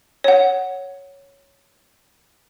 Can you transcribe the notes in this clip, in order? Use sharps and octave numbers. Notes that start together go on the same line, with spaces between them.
C#5 F#5